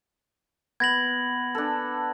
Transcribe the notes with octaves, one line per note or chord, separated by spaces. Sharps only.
B3 G#6 A#6 F#7
D4 A4